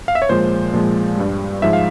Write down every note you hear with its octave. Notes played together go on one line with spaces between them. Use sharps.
F5
E5
C#5
A#2 F3 G#3 C5
A#2 F3 G#3
G2 G3
G#2 F3 G#3 E5
F5